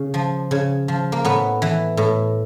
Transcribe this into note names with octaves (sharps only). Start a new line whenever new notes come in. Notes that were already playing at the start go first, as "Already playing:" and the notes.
Already playing: C#3
F3
C#3
F3
A#3
A2 B3
E3
A2